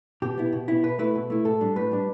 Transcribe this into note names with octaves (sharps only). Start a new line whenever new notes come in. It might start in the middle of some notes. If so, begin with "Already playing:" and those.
B2 G4
B3 E4
B2
B3 E4
B2 B4
A3 E4 B4
B2
A3 E4
A2 A4
G3 D4
A2 B4
G3 D4